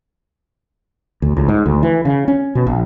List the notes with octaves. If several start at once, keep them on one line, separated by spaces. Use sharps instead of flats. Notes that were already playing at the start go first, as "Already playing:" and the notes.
D2
C#2
G#2
D2
E3
C#3
C#4
B2
A#1